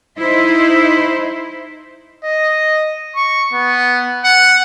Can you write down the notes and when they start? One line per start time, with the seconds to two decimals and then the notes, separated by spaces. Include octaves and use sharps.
0.18 D#4 E4 C5
2.24 D#5
3.16 C#6
3.53 B3
4.24 F#5